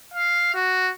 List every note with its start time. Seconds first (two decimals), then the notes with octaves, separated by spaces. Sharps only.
0.14 F5
0.54 F#4